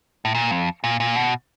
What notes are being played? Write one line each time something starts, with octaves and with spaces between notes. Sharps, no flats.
A2
A#2
F2
A#2
A#2
B2